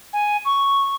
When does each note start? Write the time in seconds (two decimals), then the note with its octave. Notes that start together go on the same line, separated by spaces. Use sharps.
0.13 G#5
0.45 C#6